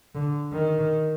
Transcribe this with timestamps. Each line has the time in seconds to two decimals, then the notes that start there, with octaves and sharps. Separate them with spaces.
0.15 D3
0.52 D#3